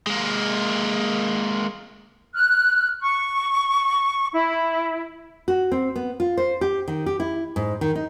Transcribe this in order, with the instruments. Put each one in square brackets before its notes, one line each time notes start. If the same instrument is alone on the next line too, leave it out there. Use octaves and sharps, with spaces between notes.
[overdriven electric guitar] G#3 A#3
[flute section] F6 F#6
C#6
E4
[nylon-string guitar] F#4
C4
B3
F4
C5
G4
D#3
G4
E4
G#2
D#3
D#4